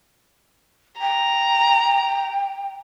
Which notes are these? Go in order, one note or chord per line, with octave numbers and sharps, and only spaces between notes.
G5 A#5